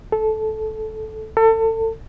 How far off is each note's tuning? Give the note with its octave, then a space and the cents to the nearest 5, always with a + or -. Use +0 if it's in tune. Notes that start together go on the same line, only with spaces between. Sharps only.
A4 -15
A4 +30